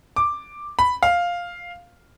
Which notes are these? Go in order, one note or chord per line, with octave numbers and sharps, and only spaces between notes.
D6
B5
F5